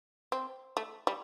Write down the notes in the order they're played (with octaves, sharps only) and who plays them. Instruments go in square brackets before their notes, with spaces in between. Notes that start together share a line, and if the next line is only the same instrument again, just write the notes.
[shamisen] C4
A3
G3